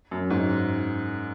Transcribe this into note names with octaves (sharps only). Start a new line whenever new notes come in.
F#2
G#2